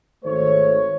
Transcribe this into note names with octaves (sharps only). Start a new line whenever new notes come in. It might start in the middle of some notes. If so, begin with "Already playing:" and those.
G#1 D#3 A3 C5 C#5